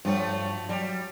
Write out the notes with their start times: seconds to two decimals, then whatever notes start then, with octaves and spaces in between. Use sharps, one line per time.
0.05 G2 F3 F#3 A3 C#5
0.69 F#3 G3